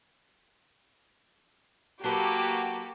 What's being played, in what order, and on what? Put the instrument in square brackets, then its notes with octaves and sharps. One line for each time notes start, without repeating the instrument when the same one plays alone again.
[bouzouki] F#3 A4 B4 [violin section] A#3 F#4 G4